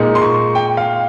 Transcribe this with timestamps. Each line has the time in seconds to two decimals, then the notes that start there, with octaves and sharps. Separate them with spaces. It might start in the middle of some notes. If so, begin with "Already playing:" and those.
Already playing: A#2 G#3 D#4
0.15 C6
0.22 C#6
0.55 G5
0.77 F5